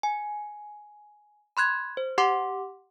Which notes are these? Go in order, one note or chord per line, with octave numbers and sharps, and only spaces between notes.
G#5
B5 C6 F#6 G#6
C5
G4 F#5 C6 D6